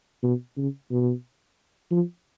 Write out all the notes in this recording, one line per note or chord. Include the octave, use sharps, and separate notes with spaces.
B2
C#3
B2
F3